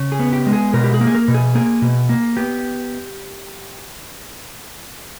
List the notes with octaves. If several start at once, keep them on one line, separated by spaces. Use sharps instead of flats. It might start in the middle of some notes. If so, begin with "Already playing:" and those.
Already playing: C#3
G#4
B3
G4
G#3
G#4
B2 A#4
G4
G#4
A#3
G#4
A#4
B2
G#4
A#3 G#4
B2
A#3
B3 G4